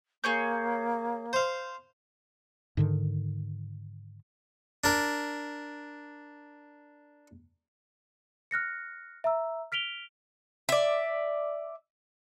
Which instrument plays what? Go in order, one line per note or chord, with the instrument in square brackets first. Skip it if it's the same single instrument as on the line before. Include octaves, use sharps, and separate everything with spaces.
[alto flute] A#3 [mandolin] G#4 C#5 G6
[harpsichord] C5 F5
[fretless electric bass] G#2 D3 D#3
[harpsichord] D4 A#4
[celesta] F6 F#6 A#6 C#7
E5 A#5 E6
F6 B6 D7 F7 G7
[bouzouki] D5 E5